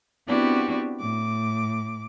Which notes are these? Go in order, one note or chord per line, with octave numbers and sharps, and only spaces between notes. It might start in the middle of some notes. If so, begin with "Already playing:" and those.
B3 C4 D4 E4 F#4 G4
A2 D6